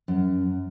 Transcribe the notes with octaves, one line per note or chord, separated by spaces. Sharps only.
F#2